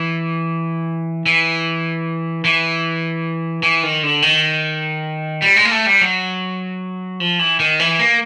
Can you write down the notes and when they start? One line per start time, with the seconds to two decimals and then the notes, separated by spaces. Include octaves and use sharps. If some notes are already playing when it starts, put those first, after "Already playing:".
Already playing: E3
1.26 E3
2.45 E3
3.63 E3
3.83 D#3
4.03 D3
4.22 D#3
5.42 G3
5.56 G#3
5.65 A#3
5.71 A3
5.86 G3
6.01 F#3
7.20 F3
7.39 E3
7.60 D#3
7.79 E3
7.99 A#3